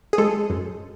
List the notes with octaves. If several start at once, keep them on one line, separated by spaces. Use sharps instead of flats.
G#4
G#3 A4
F#2